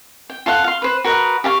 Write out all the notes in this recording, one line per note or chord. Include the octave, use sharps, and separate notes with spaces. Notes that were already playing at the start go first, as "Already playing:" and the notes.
G5
F4 A4 F5 F#5
F5 C6
B4 C5
F#4 A#4 B4 D#5
G4 F5 A5 C#6